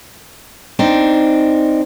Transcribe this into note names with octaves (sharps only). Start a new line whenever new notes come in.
C4 D4 D#4